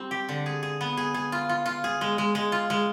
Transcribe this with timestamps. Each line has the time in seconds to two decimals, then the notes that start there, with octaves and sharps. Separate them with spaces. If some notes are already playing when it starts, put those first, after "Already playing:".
Already playing: G3 C4
0.11 G4
0.29 D3
0.46 G#4
0.63 G#4
0.81 B3
0.97 G#4
1.14 G#4
1.32 F4
1.49 F4
1.66 F4
1.84 G#4
2.01 G#3
2.18 G#3
2.35 G#3
2.52 F4
2.70 G#3